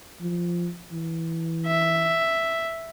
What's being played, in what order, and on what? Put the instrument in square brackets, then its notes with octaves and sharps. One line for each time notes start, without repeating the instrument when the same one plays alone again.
[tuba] F3
E3
[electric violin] E5